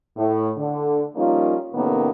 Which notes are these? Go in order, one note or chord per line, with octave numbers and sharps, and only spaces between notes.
A2
D3
F3 G3 A#3 C#4 D#4 F4
A2 C3 D#3 A#3 B3 C#4